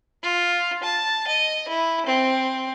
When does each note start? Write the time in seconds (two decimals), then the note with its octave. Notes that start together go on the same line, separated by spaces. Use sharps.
0.23 F4
0.83 A5
1.28 D#5
1.68 E4
2.06 C4